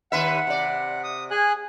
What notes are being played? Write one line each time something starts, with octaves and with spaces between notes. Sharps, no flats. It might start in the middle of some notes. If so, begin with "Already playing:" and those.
D#2 B4 E5 F#5
C3 D5
D#6
G#4 G#5 F#6